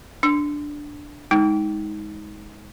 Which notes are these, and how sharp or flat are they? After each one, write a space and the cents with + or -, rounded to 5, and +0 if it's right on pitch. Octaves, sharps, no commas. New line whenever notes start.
D4 +0 E6 +25
G#3 +0 D#4 +20